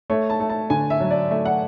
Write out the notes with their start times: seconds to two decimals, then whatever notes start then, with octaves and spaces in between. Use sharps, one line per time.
0.10 A3 C#5
0.30 A5
0.40 A3
0.50 A5
0.70 D3 G#5
0.90 E5
1.00 F#3
1.11 D5
1.31 A3 E5
1.46 F#5